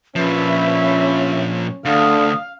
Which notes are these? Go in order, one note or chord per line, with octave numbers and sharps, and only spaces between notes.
A#2 F3 C#4 B4 E5
D2 D3 F5 D#6